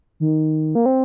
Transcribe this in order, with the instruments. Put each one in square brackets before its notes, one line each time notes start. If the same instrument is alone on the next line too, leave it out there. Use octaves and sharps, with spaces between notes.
[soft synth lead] D#3
A#3
C4